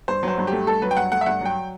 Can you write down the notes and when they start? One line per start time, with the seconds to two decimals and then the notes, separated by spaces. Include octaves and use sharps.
0.08 G2 C5
0.23 F#3 C5
0.38 G2
0.47 G4
0.53 A3
0.67 G2 A4
0.82 F#3 B4
0.91 G5
0.97 G2 F#5
1.12 A3 F#5
1.21 E5
1.26 G2 F#5
1.41 F#3 G5